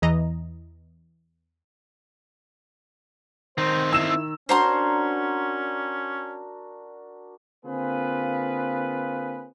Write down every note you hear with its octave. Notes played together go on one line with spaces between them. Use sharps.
E2 E3 D#5 A#5
D#3 C4 D#4 C5
E4 E6 E7
C#4 D4 F#4 A#4 C5 A#5 C6
D3 A#3 C4 F4 G#4 B4